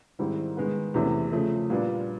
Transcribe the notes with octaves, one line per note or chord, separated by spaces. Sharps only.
G#2 D#3 G3 C4 E4
D#3 G#3 B3
E2 C3 E3 A3 C#4
C#3 F3 A3
A#2 G3 B3 D4 F4